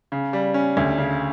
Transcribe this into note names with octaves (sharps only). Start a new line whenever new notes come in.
C#3
G3
C#4
D2
C#3